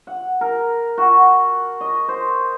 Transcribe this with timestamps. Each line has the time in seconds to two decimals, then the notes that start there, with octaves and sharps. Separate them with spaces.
0.07 F#5
0.41 A#4
0.98 F#4
1.81 D#5
2.08 C5